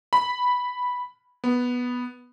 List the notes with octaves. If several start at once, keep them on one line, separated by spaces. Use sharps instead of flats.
B5
B3